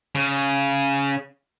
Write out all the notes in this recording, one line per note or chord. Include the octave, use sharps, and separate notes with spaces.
C#3